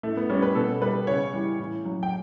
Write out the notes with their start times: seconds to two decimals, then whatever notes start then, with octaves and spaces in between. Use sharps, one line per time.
0.03 A2 A3
0.17 B3
0.30 G3 C#4
0.42 B4
0.55 B2 A4
0.82 G3 B4
1.07 C#3 C#5
1.33 E3 G3
1.59 A2
1.85 F#3
2.03 G5